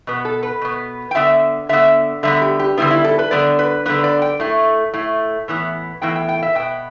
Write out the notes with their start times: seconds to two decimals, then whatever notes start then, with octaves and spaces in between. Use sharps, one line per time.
0.07 B2 B3
0.25 A4
0.43 B4
0.61 B2 B3
1.11 G5
1.15 D3 B3 E5
1.69 D3 B3 E5
2.23 D3 G3 B3 E5
2.42 G4
2.59 G4
2.77 D3 G3 B3 E4
2.91 E4
3.04 A4
3.19 B4
3.31 D3 G3 B3 D5
3.59 B4
3.86 D3 G3 B3 B4
4.04 D5
4.22 G5
4.40 A2 A3
4.93 A2 A3
5.48 A2 E3 B3
6.02 A2 E3 B3 G5
6.15 G5
6.29 G5
6.43 E5
6.55 B2 B3 G5